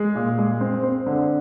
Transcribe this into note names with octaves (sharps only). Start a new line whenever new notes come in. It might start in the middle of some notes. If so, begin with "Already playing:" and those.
Already playing: G#3
A#2
G#3
C4
C4
D3